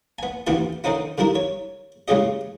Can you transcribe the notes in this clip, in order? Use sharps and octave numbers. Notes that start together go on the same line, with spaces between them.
B3 G#5
A1 D2 B3 E4 G4 G#5
D3 D#3 C4 C#4 D#4 E4
D3 D#3 G3 E4 A#4
C#5
A2 C#3 G#3 C#4 G4 D#5